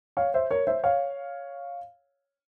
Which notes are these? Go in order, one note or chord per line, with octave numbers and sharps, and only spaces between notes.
C#5 F5
C5 E5
A#4 C#5
C5 E5
C#5 F5